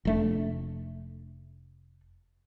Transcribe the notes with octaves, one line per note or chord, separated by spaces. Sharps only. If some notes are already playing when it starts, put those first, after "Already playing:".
F1 A3 D4